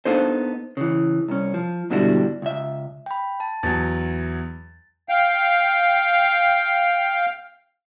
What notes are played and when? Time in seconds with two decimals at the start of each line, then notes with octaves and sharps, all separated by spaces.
0.05 A#3 B3 D4 D#4 A4 C5
0.77 C#3 E3
1.28 C2 C#4
1.54 F3
1.90 G#2 B2 D3 G3 E4 F#4
2.42 C#2 E5
3.06 G5 B5
3.40 A5
3.63 E2 F#3 A6
5.09 F5 G5